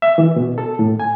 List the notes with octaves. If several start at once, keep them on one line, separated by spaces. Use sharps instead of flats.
E5
E3
B2
A4
A2
G#5